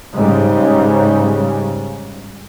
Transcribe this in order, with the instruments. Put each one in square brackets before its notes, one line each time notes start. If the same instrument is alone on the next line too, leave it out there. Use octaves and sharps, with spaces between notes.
[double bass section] G#2 C#3 G3